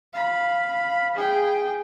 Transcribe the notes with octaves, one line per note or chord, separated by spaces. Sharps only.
F5 B5
G#4 G5